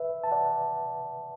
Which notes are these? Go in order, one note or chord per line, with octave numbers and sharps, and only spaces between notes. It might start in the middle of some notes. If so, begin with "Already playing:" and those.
Already playing: B4 E5
A5
D5 F#5